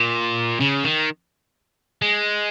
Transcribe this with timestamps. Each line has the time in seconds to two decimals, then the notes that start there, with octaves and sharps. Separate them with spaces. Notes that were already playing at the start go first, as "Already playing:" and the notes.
Already playing: A#2
0.61 C#3
0.84 D#3
2.02 G#3